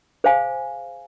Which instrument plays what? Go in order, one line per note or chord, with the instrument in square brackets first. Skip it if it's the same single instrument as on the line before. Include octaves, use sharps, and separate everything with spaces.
[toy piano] G#4 C5 F5 G#5